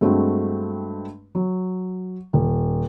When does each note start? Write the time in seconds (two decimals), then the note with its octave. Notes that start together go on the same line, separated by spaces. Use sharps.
0.01 G2 G#3 A3 C4 F#4
1.35 F#3
2.33 D#1